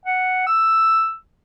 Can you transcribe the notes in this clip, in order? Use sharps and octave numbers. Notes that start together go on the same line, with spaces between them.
F#5
E6